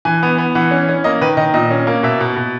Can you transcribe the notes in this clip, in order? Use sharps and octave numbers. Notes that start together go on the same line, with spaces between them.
E3 G#5
B3
B3
E3 F#5
C#4
C#4
A#3 D#5
D#3 B4
D#3 D#5
A#2 D#5
C#4
A#3
B2 E5
B2
B2